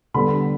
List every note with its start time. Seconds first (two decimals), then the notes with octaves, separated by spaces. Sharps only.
0.14 D3 G3 B3 B5